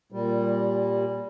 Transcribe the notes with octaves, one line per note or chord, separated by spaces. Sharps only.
A#2 G3